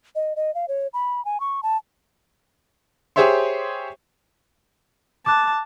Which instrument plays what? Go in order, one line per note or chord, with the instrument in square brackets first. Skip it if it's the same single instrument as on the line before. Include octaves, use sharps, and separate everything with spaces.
[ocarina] D#5
D#5
F5
C#5
B5
G#5
C#6
A5
[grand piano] G4 G#4 C5 C#5 E5 C6
[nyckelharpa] A5 [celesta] D6 F#6